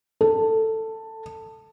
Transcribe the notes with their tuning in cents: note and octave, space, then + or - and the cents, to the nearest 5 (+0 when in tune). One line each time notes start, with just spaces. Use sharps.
A4 +10